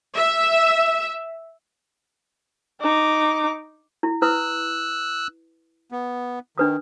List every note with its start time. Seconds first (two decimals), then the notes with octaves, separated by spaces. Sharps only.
0.16 E5
2.81 D#4 D6
4.03 E4
4.22 E4 B4 D#6 E6 F#6
5.92 B3
6.58 D#3 D4 B4 D#6